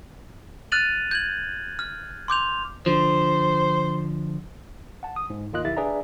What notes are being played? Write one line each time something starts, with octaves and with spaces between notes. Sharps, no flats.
F6 F#6 A6 D#7 F7 F#7
G6 G#6 F#7
F6
C6 D6 G6 F7
D3 F3 C5
F#5 A5
D#6
G#2
D#2 D#3 F4 D#5 F#6
B1 D#3 E4 G4 E5 A6
D4 G#4 B4 D5 E5 A#5